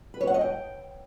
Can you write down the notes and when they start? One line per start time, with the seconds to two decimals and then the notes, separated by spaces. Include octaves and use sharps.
0.14 B4
0.21 C#5
0.27 F#5
0.34 D#5
0.41 G5